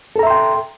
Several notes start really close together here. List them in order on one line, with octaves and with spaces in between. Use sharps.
A4 A#5 E5 C6 G5